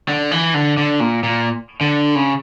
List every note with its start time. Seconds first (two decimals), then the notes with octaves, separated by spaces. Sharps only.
0.08 D3
0.31 E3
0.54 D3
0.77 D3
1.00 A#2
1.24 A#2
1.81 D3
2.15 C#3